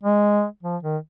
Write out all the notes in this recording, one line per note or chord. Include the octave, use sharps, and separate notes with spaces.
G#3
F3
D#3